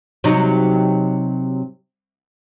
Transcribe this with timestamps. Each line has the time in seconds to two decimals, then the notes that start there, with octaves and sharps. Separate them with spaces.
0.24 C3 F#3 D#4